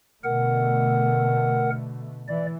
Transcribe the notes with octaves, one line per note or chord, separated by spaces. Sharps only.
B2 D3 A3 A#4 F#5
E3 D5